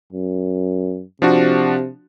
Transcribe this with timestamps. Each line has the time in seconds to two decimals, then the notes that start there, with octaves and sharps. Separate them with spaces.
0.13 F#2
1.22 C3 F3 D4 F#4